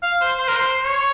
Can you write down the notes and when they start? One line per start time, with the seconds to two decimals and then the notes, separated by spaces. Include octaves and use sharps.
0.03 F5
0.21 C5
0.39 C5
0.49 A#4
0.56 C5
0.83 C#5